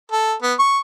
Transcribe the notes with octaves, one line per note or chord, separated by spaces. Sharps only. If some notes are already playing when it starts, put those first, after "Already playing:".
A4
B3
C#6